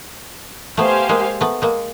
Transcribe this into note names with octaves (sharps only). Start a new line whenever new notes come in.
A3 B3 G4 C5 F5 G#5
G#3 A#3
A3 B3
G#3 A#3